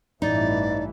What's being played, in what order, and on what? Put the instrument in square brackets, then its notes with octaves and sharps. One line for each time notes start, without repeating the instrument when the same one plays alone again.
[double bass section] A1 G2 E3 [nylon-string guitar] D#4 [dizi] D5